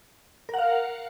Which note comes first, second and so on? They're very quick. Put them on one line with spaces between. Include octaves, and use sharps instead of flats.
A#4 F#5 F5